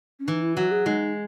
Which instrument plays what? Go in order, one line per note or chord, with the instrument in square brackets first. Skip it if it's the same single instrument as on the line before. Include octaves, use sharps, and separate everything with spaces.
[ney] C#4
[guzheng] E3 [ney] D#4
[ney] E4
[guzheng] F#3 [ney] F#4
[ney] G#4
[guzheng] G#3 [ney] D#4